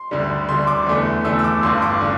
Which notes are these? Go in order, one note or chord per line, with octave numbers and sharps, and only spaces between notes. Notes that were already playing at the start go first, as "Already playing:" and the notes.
Already playing: C6
D2 D3 G3
D2 D3 G3 C6
D6
E2 D3 A3
E2 D3 A3 E6
E6
D6
G1 G2 D3 C6
D6
D3